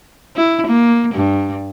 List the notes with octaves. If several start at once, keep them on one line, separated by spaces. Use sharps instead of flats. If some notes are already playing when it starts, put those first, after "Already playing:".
E4
A#3
G2